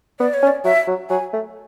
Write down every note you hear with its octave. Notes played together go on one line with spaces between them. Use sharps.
B3 D5
C#5
C#4
D5
F#3 E5
F#3
F#3 G#5
A3